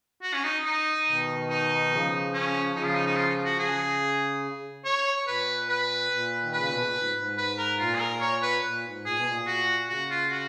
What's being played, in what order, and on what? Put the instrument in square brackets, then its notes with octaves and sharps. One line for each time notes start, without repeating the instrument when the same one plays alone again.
[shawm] F#4
C#4
D#4
D#4
[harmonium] B2 D#3
[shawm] D#4
[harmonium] C#3 F3
[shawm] C#4
[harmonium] C#3 F3 [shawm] D#4
[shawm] F4
D#4
D#4
F4
F#4
[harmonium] C#3 [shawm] G#4
[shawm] C#5
[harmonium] A#2 [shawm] B4
[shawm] B4
[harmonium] A#2
D#3
[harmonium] C#3 [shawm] B4
[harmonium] B2
A#2
G#2
G#2
[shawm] B4
A#4
[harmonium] A#2 [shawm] F4
[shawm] G#4
A#4
C#5
B4
[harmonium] A#2
G#2
[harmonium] A#2 [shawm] G#4
[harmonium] B2
A#2
[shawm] F#4
[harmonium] C#3 [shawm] F#4
[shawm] F4
F#4